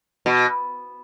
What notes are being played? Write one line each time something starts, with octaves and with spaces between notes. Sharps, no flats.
B2